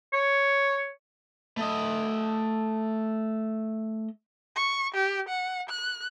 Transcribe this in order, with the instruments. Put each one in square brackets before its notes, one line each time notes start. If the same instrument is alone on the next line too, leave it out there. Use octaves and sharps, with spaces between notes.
[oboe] C#5
[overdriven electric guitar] A3 D#5
[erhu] C#6
G4
F#5
F#6